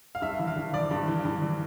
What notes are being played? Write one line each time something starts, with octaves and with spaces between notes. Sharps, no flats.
F5
G2 E5
E3
F5
G2
E3 D5
G2
E3
G2
E3